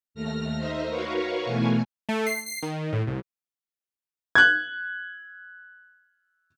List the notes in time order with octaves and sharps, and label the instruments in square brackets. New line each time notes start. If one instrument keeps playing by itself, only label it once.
[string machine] D#2 A3 F6 A#6
D#4 C5 D#5 E5
F#4 A#4 B4 C#5 F5 C#6
B2 E3 A3 G#5
[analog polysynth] A3
C7
C7
D#3
A2
C2
[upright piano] F#6 G#6